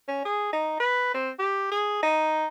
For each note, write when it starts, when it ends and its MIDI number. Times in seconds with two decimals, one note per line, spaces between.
0.08 0.20 61
0.25 0.50 68
0.53 0.79 63
0.80 1.10 71
1.14 1.30 60
1.39 1.67 67
1.71 2.00 68
2.03 2.46 63